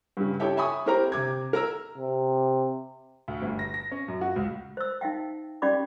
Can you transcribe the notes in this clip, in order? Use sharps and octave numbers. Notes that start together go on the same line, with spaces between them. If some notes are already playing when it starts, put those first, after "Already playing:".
G2 C#3
E4 G4 A4 C#5 E5 G5
E5 G#5 B5 C#6 D#6
C4 E4 G4 A#4 C5 A#5
C3 D6 G#6
A#4 A#5 E6
C3
D2
G1
A#6
A#6
C#4
F#2
F#4
C#2
C5 E6
D#4 E5 F5 G5
C#4 G4 D5 F5 B5 D6